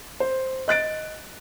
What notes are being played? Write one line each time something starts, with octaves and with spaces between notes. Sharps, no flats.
C5
D#5 F#6 A6 D7